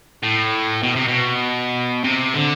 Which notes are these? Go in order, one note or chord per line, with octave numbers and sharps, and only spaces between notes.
A2
B2
C3
B2
C3
D3